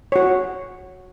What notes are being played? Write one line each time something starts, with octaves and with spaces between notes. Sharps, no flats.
F#4 C#5